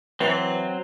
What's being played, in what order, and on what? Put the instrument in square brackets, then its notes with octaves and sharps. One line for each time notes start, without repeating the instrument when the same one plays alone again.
[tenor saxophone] E3 [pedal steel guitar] F#3 C4